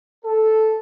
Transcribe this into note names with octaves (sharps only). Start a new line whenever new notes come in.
A4